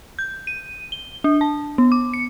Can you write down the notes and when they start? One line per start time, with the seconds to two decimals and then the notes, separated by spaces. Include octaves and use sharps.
0.19 G6
0.47 D#7
0.92 G7
1.24 D4
1.41 A5
1.78 B3
1.92 D6
2.14 C#7